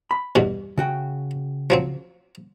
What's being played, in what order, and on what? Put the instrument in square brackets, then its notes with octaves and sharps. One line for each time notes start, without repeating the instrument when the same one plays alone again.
[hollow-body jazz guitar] B5
[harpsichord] E2 G2 B2
[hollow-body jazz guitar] C#3 F#4 G5
[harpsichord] F3 F#3 C4